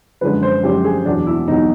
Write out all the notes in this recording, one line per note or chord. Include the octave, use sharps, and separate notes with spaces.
F#2 D3 F3 G#3 B4
C5
F#2 D3 F3 G#3 G4
G#4
E2 B2 F#3 D4
E4
E2 B2 F#3 D#4